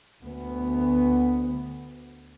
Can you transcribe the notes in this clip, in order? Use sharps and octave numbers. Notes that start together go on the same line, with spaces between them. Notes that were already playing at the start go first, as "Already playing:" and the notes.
D2 B3